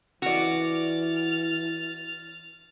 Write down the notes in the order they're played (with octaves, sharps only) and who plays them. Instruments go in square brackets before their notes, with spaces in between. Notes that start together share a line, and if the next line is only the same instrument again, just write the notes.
[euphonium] E3 [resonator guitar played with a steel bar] F#4 D5 [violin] F6 A6